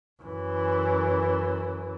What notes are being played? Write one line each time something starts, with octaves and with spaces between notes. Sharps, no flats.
F#2 E3